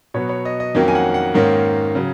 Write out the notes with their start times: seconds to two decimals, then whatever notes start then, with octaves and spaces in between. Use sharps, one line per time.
0.14 B2 F#3 B3 C#5
0.29 C#5
0.45 D#5
0.60 D#5
0.75 F2 D#3 F#3 A#3 C#4
0.88 G#5
0.95 F#5
1.14 F#5
1.34 G#2 D#3 A#3 C#4
1.95 C#3 F#3